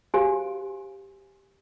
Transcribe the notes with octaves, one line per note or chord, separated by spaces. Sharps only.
F#4 G4 C5 F5 G#5